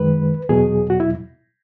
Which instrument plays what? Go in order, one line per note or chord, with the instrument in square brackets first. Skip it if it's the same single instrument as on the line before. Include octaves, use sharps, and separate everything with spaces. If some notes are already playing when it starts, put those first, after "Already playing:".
Already playing: [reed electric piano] F#2 D#3 G#3 B4
E2 B2 F#3 G#4
F#4
E4